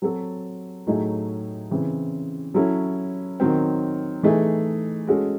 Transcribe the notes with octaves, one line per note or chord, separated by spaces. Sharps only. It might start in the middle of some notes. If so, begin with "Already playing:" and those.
F#3 C4 F#4 A4
A2 F#3 A3 D#4 G#4
C#3 E3 C4
F#3 C#4 E4 A4
D#3 F#3 C4
E3 A3 D#4 G#4
G#3 C#4 F#4 A4